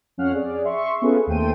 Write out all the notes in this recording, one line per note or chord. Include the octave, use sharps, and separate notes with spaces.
F2 C#4 F5 F#5 F6
G#4 D5
E5 C6 C#6
B3 C#4 F4 G#4 A4 B4
D#2 A3 C5 G5 D#7